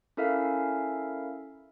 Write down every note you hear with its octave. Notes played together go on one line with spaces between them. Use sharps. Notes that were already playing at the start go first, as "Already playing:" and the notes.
C#4 E4 A4 A#4 E5 F5